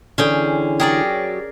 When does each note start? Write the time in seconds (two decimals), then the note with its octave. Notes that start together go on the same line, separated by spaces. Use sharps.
0.18 D3 E3 C#4 G#4 G5
0.80 F#3 G4 G#4 A#4 D5